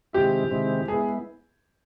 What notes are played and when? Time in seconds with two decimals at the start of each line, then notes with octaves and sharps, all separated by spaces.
0.13 C3 D#3 G#3 C4 E4 G4
0.51 C3 D#3 G#3 C4 E4
0.88 G#3 B3 E4 G#4